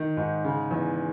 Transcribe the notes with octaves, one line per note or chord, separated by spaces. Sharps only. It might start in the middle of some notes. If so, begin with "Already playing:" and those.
Already playing: D#3
G#2
C#3
E2